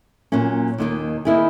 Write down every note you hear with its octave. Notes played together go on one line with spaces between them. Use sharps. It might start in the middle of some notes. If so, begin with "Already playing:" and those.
A#2 F#3 A#3 C#4
D#2 D#3 A#3
D#3 A#3 E4 G#4